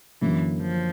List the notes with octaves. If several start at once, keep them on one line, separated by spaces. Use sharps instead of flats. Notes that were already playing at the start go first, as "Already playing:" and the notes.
F#2 D3 E3 F#3 A#3 C#4
F3